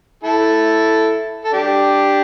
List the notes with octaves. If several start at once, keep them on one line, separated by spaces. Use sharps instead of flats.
E4 A4
A4
D4 G4